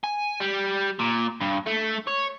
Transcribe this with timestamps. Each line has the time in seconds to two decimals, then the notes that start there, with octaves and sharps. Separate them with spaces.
0.04 G#5
0.40 G3
1.00 A#2
1.41 G2
1.66 A3
2.07 C#5